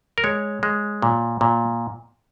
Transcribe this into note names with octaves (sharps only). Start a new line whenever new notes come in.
A#4
G#3 C#5
G#3
A#2
A#2